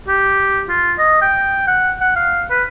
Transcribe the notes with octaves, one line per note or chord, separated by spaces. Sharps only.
G4
F4
D#5
G5
F#5
F#5
F5
B4